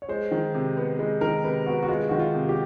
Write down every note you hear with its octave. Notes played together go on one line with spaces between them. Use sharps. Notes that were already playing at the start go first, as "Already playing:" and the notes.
C#5
G#3 C5
D#3
C3
B3
G#3 B4
D#3 A#4
C3 B4
B3 F#4
F#4
G#3 F4
D#3 F#4
F4
C3
G4